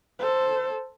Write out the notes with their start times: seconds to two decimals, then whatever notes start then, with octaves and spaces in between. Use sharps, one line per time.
0.19 A4 C5